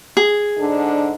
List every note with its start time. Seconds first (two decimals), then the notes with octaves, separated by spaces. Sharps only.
0.17 G#4
0.59 G#2 D3 D4